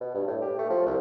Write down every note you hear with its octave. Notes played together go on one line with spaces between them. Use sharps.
B2
G2
A2
G4
A3
F3
C2